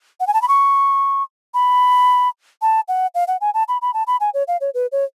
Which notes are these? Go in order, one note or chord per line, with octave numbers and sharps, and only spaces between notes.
F#5
G#5
A5
B5
C#6
B5
A5
F#5
F5
F#5
G#5
A5
B5
B5
A5
B5
G#5
C#5
F5
C#5
B4
C#5